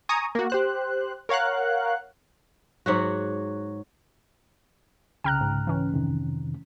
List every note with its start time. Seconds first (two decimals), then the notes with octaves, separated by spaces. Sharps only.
0.09 G#5 A#5 C#6 D#6
0.35 A#3 F#4
0.50 G4 C5 F#6
1.29 A#4 C#5 F5 F#5 F#6
2.86 G#2 F#3 F#4
5.24 C2 C#3 G5 A#5 F6 F#6
5.41 G#2
5.67 E3 C#4
5.93 F2 C3 D#3